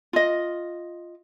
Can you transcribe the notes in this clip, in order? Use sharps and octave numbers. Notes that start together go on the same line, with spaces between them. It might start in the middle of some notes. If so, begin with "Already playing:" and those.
F4 D#5